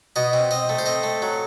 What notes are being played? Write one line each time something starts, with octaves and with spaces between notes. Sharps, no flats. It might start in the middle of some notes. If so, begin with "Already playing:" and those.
B2 D#5
C4
C4 D#5
A3
C5
C4 D#5
A3
F#3